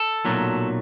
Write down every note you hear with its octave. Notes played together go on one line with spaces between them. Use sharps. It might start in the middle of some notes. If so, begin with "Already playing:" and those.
Already playing: A4
B1 A#2 F#3 A3